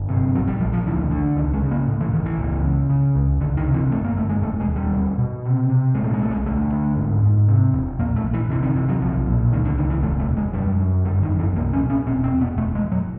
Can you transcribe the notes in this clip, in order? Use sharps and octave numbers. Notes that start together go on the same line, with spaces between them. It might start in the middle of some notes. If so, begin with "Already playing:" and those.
Already playing: G1
C3
A#1 F#3
G3
A#1 F3
F3
D2 E3
D3
C#2 D#3
G#3
C#3
A#3
A2
E3
A1 D#3
E3
C#2
C#3
C#3
C#2
C#2 D3
D#3
C3
E3
G1 A3
A#3
G1 A3
G#3
E1 A3
G#3
D#2
G3
B2
B2
C3
C3
A#2 G#3
A3
G#3
B1 A3
G#3
D2 A3
D3
G#2
G#2
C3
E1
A#1 A#3
A3
A#1
E3
C3 E3
D#3
C3 E3
F#3
B1 F3
A#2
C#2 D#3
D3
C#2 D#3
E3
E1 A3
A3
E1
G#3
F#2 G3
F#2
G1 G3
D#3
F#2
E3
C2 A#3
C#4
B2
C#4
E1 C4
C4
E1
B3
E1 A3
G#3
E1
F#3